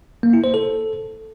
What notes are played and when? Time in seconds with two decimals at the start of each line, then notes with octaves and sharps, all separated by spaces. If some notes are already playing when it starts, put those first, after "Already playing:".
0.23 A#3
0.33 E4
0.44 C5
0.54 A4